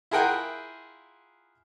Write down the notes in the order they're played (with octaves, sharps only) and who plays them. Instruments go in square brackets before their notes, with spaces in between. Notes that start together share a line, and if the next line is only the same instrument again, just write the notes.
[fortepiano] E4 F4 G#4 A#4 F#5 G5